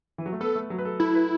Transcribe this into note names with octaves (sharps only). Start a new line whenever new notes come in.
E3
F#3
A3
B3 A4
A3
F#3
B4
A4
E4 A4
B4